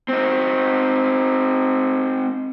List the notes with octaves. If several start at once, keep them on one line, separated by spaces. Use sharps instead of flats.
C4 D#4